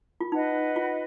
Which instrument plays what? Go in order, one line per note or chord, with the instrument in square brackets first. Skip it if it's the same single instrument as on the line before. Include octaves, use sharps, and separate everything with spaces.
[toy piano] F4
[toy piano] D#4 [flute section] B4 D#5 F#5
[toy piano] F4